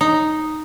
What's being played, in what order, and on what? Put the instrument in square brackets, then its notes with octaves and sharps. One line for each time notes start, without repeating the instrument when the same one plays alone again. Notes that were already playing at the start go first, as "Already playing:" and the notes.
[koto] D#4